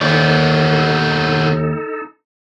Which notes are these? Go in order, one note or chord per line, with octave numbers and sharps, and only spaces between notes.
D#2 D#3 B3 D#4 A4 D5